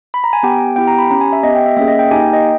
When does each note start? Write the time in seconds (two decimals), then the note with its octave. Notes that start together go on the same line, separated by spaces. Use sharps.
0.14 B5
0.24 A#5
0.33 G#5
0.43 B3 G4 G5
0.76 B3 E4 G4 G5
0.87 A#5
0.98 B5
1.11 C#4 G4 A#5
1.21 G#5
1.32 E5
1.43 B3 G4 D#5
1.55 G5
1.66 E5
1.77 A#3 C#4 G#4 E5
1.88 D#5
1.99 G5
2.11 A#3 D#4 G4 G#5
2.21 G5
2.33 D#5